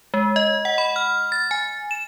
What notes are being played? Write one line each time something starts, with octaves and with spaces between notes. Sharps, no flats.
G#3
D#5
F#5
B5
F6
A6
G#5
E7